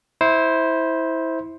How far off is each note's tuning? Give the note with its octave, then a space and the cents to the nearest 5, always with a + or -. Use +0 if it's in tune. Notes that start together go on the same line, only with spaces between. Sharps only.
E4 -20 C5 +0